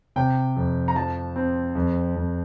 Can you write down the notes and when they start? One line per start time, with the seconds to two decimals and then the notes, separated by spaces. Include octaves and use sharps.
0.16 C3 G5
0.56 F2
0.88 A#5
0.96 F3 A5
1.36 C4
1.75 F2
2.16 F2